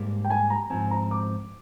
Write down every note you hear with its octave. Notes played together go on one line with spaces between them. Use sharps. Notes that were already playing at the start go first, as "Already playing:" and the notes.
Already playing: G#2 G3 A#3
G5
G#5
A#5
G#2 F3 C4 G#5
A#5
D6